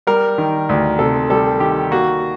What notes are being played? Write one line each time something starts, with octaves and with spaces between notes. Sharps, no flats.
G3 A#4
D#3
D2
C3 A4
G3 A4
D#3 G4
A#3 F#4